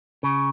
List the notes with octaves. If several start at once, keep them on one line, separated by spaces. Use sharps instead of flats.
C#3